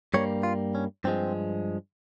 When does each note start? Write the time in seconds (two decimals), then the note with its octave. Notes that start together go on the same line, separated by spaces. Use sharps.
0.14 G2 G3 A#3 C#5
0.43 F4
0.75 C#4
1.04 G2 F3 G#3 C4